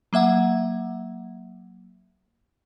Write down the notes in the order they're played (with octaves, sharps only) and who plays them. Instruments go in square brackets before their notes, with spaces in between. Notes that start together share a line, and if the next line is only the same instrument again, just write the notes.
[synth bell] F#3 A#3 E5 F#5